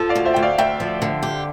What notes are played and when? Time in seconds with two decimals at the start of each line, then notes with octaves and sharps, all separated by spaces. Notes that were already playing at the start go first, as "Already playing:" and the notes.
Already playing: F3 A4
0.09 D5 F5
0.15 D2
0.25 C5 E5
0.34 D2 G5
0.43 D5 F5
0.58 D2 E5 G5
0.80 F3
1.02 D3
1.23 G4